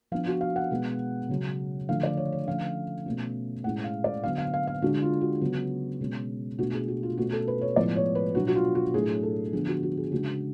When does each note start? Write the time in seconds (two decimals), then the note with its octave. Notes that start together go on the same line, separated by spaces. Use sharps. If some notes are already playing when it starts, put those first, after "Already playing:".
0.12 F3 B3 D4 F5
0.27 F#4
0.41 F5
0.56 F#5
0.71 B2 G#3 B3
1.29 C#3 F#3 C#4
1.89 D3 F3 A3 D4 F5
2.03 D5
2.17 C#5
2.32 C#5
2.48 D3 F3 A3 C#4 F5
3.06 B2 A3 C#4
3.64 A2 G#3 C#4 F#5
3.84 F5
4.04 D5
4.23 D3 F#3 B3 F5
4.38 F5
4.54 F5
4.67 F5
4.82 D3 G#3 D4 F#4
5.02 F4
5.21 F#4
5.41 C#3 F#3 B3
6.01 B2 G#3 C#4
6.59 B2 A3 D4 F#4
6.73 G#4
6.88 F#4
7.03 F4
7.17 B2 A3 C#4 F#4
7.32 A4
7.48 B4
7.61 C#5
7.76 A2 F3 G#3 B3 D5
7.96 C#5
8.15 B4
8.35 B2 F#3 B3 D4 F#4
8.47 F#4
8.55 F4
8.75 F#4
8.94 A2 F#3 A3 D4 G#4
9.23 A4
9.53 D3 F3 B3 D4 G#4
9.68 F#4
9.83 F#4
9.97 G#4
10.11 C#3 G#3 D4 F#4